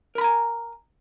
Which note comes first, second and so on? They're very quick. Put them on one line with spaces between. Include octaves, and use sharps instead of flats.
A#4 B5 A#5 G#5